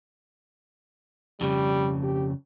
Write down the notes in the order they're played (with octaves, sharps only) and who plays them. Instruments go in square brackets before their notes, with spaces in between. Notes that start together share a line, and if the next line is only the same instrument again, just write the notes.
[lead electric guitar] F2 C#3 [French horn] G3
[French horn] G4